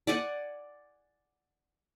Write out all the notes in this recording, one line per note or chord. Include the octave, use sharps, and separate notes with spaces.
D5 F#5 G#5